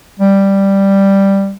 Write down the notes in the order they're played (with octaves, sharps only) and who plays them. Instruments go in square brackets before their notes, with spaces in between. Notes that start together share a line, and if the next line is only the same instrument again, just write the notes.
[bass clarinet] G3